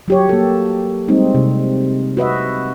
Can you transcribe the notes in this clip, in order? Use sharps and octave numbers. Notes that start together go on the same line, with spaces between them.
F#3 G4 C#5
A#3 A4
G3 G#3 C4 D#4
C3
F#4 B4 D#5 E5